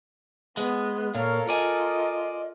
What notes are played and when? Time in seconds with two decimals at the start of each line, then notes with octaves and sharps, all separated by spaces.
0.57 G#3 B3
1.15 A#2 A4 A#4 C#5 F5
1.49 F4 D5 D#5 G#5